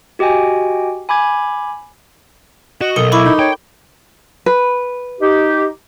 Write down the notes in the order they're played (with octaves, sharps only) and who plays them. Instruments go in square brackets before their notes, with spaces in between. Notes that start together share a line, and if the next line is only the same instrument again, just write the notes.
[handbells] F#4 G4 D#5 G5 G#5
G#5 B5 D6 G#6
[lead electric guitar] F#4 [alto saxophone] D#5
[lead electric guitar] B1 [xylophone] A4 A#4 C#7 [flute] D#6
[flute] E4 [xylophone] B5 C#6 D6
[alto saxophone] D#4
[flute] C#5 [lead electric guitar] G5
[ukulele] B4
[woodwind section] D#4 G4